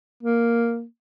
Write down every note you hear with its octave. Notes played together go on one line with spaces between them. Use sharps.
A#3